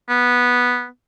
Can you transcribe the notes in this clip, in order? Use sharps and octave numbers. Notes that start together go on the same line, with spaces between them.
B3